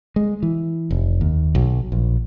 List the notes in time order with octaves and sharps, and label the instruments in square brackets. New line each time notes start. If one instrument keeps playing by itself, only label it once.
[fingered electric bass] G#3
E3
F1
D#2
B1
A#1